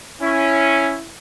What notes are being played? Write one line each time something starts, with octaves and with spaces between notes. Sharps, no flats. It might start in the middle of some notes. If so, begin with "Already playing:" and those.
C#4 E4